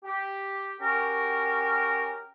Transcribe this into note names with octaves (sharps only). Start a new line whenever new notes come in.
G4
C#4 F#4 G4 A#4